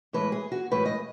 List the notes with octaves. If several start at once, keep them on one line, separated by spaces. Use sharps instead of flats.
A2 E3 G#3 B4
G#4
F#4
A2 E3 G#3 B4
D#5